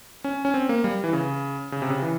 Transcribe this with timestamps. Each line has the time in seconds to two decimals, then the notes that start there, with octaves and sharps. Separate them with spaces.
0.24 C#4
0.45 C#4
0.54 C4
0.69 A#3
0.84 G3
1.04 E3
1.13 C#3
1.72 C#3
1.82 C3
1.90 C#3
2.02 E3